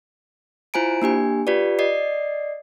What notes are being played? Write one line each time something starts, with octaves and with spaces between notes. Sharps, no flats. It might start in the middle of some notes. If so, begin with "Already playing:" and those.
E4 F4 C5 G#5 A#5 D7
A#3 D4 G4 G#5
F4 G4 B4 D5
D5 D#5 C7